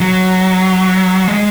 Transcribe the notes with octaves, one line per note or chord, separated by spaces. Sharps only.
F#3
G#3